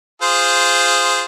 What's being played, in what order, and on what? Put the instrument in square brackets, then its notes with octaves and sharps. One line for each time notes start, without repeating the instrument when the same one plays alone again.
[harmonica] F4 G#4 C5